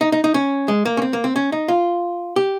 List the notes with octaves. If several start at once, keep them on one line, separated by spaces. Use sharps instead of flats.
D#4
D#4
D#4
C#4
G#3
A#3
C#4
C4
A#3
C4
C#4
D#4
F4
G4